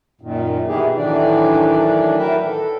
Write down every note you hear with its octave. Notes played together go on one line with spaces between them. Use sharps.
F#2 A#2 D#3
B2 D#3 E3 E4 G4 G#4
A2 D#3 E3 F#3 D4 D5
F#3 A#4 B4 E5 G5
A4